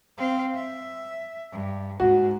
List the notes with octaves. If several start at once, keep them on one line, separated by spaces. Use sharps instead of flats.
C4 F5
E5
G2
G#2 F#4